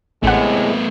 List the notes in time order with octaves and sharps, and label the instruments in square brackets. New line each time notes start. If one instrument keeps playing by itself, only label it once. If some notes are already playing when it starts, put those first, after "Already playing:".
[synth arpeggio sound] A1 F#5 [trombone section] A2 C3 G#3 [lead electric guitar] A3 B3